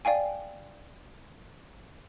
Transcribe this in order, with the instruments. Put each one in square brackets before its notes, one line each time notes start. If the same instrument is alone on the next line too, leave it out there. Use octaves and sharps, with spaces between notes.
[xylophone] D5 F5 G5 G#5